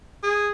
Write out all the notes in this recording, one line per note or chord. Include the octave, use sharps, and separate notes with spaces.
G#4